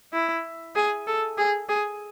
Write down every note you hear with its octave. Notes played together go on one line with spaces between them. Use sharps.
E4
G#4
A4
G#4
G#4